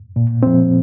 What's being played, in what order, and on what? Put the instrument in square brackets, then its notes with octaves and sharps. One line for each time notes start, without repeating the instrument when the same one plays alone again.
[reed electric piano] A#2
F3 C4